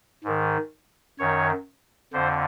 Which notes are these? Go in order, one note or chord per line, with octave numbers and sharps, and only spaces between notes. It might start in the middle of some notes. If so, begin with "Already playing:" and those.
G#2 D#3
F#2 D#3 C#5
F2 D3 C5